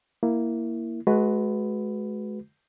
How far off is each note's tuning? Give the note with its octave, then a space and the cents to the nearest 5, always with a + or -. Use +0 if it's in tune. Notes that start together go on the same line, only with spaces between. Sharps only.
A#3 +0 E4 +0
G#3 +35 F#4 +0 B4 +10